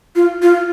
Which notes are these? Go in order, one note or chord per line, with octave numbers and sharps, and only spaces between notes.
F4
F4